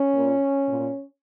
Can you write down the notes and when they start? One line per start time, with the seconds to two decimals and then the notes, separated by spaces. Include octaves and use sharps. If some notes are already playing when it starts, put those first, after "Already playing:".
Already playing: C#4
0.14 A#2
0.67 A#2